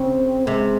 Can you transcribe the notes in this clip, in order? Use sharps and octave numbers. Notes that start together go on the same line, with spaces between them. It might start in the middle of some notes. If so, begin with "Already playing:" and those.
Already playing: C#3 C4
C3 G#3